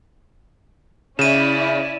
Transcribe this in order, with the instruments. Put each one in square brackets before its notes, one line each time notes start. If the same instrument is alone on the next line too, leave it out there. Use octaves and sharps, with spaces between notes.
[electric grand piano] C#3 [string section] C#4 E4 D5 [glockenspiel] D#7 E7